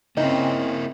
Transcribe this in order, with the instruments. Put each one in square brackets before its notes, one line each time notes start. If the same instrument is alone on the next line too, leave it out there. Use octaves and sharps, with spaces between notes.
[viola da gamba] C#3 C4 [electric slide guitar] A#3 E4 [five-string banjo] D#4